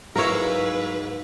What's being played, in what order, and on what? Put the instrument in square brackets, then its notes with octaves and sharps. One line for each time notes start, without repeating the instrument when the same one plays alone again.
[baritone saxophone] G#2 [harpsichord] F#3 A#3 E4 [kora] A#4 C#5 [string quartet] B4